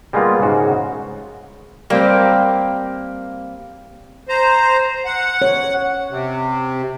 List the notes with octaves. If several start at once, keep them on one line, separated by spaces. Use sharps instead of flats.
G3 G#3 A#3 B3 F4
G#2 C#3 F#4
G3 A#3 C4 G4
C5 A#5
F#5
C#5
C3